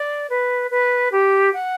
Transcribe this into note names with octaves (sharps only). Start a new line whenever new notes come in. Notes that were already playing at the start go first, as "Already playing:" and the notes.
Already playing: D5
B4
B4
G4
F#5